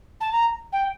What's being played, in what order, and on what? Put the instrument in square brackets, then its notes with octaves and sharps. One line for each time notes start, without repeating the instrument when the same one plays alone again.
[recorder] A5
A#5
G5